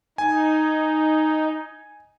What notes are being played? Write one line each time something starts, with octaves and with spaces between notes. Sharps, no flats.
D#4 G#5